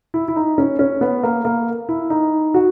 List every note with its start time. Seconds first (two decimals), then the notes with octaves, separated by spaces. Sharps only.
0.14 E4
0.28 E4
0.36 D#4
0.58 C#4
0.79 C#4
1.01 B3
1.23 A#3
1.45 A#3
1.89 E4
2.10 D#4
2.54 F#4